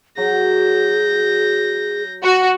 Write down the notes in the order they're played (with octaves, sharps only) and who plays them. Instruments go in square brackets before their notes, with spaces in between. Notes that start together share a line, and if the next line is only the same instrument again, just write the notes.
[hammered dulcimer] F#3 [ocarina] G#4 [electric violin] G6 A#6
[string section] F#4